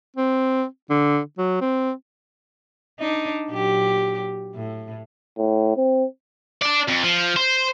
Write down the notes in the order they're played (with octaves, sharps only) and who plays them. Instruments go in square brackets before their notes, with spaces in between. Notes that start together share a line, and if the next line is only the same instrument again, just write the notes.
[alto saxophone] C4
D3
F#3
C4
[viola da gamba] D4 D#4
A#2 F#3 G4
A2
[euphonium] A2
C4
[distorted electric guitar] D4 D5
F2
F3
C5